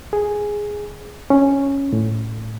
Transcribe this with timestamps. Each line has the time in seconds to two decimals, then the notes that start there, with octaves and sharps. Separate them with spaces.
0.13 G#4
1.30 C#4
1.93 A2